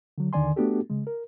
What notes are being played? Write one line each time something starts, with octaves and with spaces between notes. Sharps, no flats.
D3 F#3
D#2 D3 D#3 D5 G#5 C6
A3 B3 D4 F#4 G4 A4
C#3 G#3
A#4